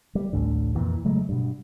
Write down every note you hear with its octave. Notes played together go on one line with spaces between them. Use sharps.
G3
A1 D2 A2 D3
F2 A#2 E3
C#3 F#3 G#3 A3
G2 B2